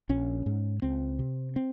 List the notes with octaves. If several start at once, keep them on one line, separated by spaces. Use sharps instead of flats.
A#1 C#4
G#2
C#2 C4
C3
C4